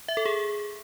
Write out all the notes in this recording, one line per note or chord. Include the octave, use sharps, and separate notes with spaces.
E5
A4
G#4